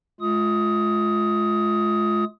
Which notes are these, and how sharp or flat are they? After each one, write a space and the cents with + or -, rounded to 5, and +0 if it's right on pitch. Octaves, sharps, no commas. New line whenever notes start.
G#3 +40 F4 +0 D#6 +15